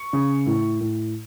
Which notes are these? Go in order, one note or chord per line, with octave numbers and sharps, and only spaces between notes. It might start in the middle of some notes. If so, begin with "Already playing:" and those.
Already playing: C#6
C#3
A2
A2